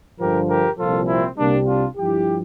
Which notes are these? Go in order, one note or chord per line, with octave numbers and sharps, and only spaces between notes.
G2 D3 F3 G4 A#4
G4 A#4
C2 A#2 F3 F4 A4
C4 E4
C2 C3 G3 A#3 D4
D4 F4
G2 F3 E4 G4